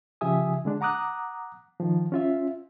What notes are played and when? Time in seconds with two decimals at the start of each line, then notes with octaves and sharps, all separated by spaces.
0.21 C#3 F3 G4 E5 G#5 D#6
0.65 D3 G#3 D4
0.81 F#5 A#5 D6 D#6 F#6
1.80 D#3 F3
2.12 C#4 F4 E5